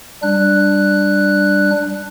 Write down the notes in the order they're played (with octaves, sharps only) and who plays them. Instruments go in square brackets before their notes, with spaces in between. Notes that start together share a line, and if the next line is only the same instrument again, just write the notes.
[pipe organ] G3 D4 F#6